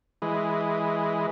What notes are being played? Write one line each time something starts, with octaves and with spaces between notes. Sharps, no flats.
E3 G#3